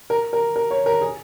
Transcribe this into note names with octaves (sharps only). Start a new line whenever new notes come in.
A#4
A#4
A#4
C#5
A#4
G#4